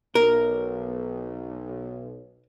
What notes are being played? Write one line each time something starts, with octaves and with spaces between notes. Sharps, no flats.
B1 A#4